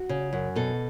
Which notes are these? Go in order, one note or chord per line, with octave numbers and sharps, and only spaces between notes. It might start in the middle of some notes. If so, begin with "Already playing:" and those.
Already playing: F#4
C#3
F#2
B2 A4